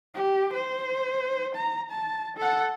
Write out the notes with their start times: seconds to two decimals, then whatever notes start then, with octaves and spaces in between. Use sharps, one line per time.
0.14 G4
0.54 C5
1.55 A#5
1.91 A5
2.37 A4 F#5